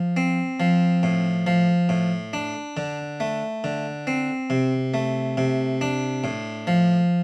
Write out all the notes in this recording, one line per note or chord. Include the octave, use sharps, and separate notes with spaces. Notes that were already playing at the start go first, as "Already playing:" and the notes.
Already playing: F3
C4
F3
A2
F3
A2
D4
D3
A3
D3
C4
C3
A3
C3
D4
A2
F3